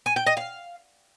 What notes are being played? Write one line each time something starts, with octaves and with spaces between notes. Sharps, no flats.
G#5
G5
D#5
F5